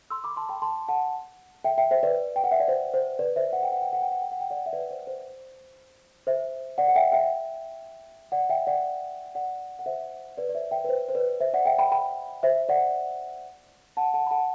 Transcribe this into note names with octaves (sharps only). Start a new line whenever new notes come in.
C6 E6
B5 D6
A5 C6
G5 B5
A5 C6
F#5 A5
E5 G5
E5 G5
C5 E5
B4 D5
G5
F#5
E5
D5
C5
C5
B4 D5
C5 E5
F#5
G5
F#5
G5
F#5
G5
F#5
G5
F#5
G5
D5 F#5
E5
B4 D5
C5
C5
C5 E5
D5 F#5
F#5
E5 G5
E5 G5
D5 F#5
E5 G5
D5 F#5
D5 F#5
F#5
C5 E5
B4 D5
D5
C5 E5
E5 G5
B4
C5
C5
B4 D5
C5 E5
D5 F#5
E5 G5
G5 B5
G5 B5
C5 E5
D5 F#5
F#5 A5
F#5 A5
B5
F#5 A5